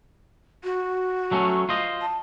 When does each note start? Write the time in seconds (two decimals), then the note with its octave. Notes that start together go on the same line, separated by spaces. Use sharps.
0.64 F#4
1.31 F#3 A3 C#4
1.69 F4 C5 D#5
2.02 A5